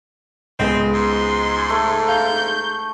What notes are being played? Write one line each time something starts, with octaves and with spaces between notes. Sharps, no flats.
C#2 G#3 B3 C4
G#2 C6
A3
F5 A#5 G6